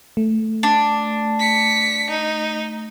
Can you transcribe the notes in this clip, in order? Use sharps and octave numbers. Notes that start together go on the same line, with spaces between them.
A3
D4
B6 C#7
D#4